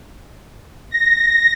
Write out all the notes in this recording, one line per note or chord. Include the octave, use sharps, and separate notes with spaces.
A#6